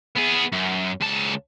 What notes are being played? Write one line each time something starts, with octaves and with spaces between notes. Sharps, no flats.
B3 G#4
F#2
C#2 A5